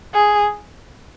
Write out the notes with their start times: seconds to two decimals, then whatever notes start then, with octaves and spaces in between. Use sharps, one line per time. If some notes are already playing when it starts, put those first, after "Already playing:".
0.14 G#4